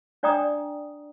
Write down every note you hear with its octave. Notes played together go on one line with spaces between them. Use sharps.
D4 D5 G5 A#5 D#6